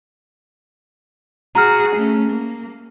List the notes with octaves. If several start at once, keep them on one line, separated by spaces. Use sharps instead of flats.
F#4 G#4 A#5 F6
A3 C#4
A#3